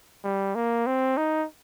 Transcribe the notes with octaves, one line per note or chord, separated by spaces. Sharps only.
G3
A#3
C4
D#4